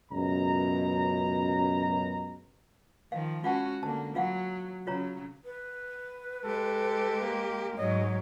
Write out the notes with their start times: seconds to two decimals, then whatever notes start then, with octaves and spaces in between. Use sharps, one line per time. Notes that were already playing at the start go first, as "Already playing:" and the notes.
0.12 C#2 F#2 B2 A#5
3.12 D#3 F3 F5
3.44 G#3 C#4 F4 F#4 F#5 A5
3.83 D3 A#3 A5
4.15 F#3 F4 F5 F#5
4.87 C#3 F#3 F4 C#5 A#5
5.45 B4
6.44 G#3 G4 A4
7.21 A#3
7.78 G#2 F#3 C#5 D#5